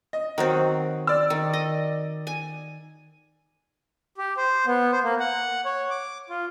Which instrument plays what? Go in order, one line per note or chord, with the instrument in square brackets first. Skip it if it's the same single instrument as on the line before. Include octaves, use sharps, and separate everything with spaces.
[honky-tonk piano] D#5
[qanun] D#3 F#3 C4
[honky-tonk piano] D5 E6
[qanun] D#3
D#5
G#5
[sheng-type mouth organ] G4
C5
B3
C5
A#3
F#5
C#5
D6
F4